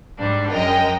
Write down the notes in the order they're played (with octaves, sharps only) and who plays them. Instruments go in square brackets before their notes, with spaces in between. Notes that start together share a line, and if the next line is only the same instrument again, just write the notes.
[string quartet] G#2 G3 D4
[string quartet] F#2 G#3 [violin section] A#4 D#5 G5